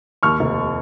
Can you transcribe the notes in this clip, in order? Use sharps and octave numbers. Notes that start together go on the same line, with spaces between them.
D#2 C#6 F6
F1